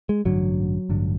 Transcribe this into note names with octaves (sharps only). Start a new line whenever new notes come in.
G#3
A1 G2 D3 F#3
A1 G2 D3